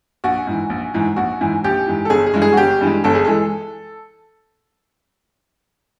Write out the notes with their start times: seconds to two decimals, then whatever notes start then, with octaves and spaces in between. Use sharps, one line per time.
0.24 A#1 F#4
0.47 G#2 E3
0.70 A#1
0.94 G#2 E3
1.16 A#1 F#4
1.41 G#2 E3
1.64 A#1 G4
1.87 G#2 E3
2.05 A4
2.10 G1 G#4
2.26 G#4
2.34 G2 E3 G#3
2.42 G#4
2.53 F#4
2.57 G1 G4
2.81 G2 E3 G#3
3.04 G1 A4
3.15 G#4
3.25 E3 G#3 A4